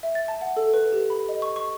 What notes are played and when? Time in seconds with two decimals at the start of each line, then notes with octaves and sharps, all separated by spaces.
0.03 E5
0.15 A6
0.28 A5
0.42 F#5
0.56 A4
0.74 B4
0.92 G4
1.10 B5
1.29 D#5
1.42 C#6
1.56 C#6